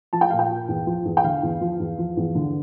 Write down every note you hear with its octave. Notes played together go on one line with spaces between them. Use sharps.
F3 A5
G5
A#2 F5
G5
A#2
E2
F3
E2
G5
D3 F5
E2
F3
E2
F3
E2
D3